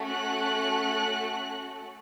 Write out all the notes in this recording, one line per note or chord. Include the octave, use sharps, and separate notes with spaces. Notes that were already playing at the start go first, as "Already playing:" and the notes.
Already playing: A3 C#4 F#4 A4
F#6